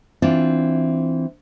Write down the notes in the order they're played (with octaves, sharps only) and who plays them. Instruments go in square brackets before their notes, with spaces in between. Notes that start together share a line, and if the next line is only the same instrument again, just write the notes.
[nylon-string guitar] E3 C4 D4 F4 D5